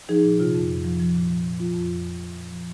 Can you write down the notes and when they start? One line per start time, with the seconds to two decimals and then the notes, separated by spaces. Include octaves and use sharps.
0.09 F3 D#4 G#4
0.23 A#2
0.39 C3 F4
0.55 F2
0.70 F2
0.84 F3
1.00 F3
1.15 A#2
1.30 F3
1.45 A#2
1.60 F3 F4
1.75 F2
1.90 F3
2.06 F2
2.20 F3
2.36 A#2
2.51 F3